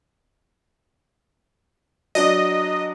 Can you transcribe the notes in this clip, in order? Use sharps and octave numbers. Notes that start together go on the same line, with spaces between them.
F#3 D4 D#5